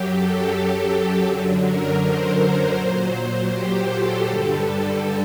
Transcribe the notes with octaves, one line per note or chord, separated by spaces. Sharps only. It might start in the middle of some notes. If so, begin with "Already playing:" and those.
Already playing: F#2 F#3 G4
A4
G4
A4
F#2 D3 F#3
A#4
C5
A#2 F#3
G4
A4
G2 D3 G3 A4
A4